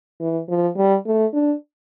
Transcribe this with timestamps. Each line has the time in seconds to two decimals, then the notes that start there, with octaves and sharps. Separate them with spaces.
0.21 E3
0.49 F3
0.76 G3
1.06 A3
1.34 D4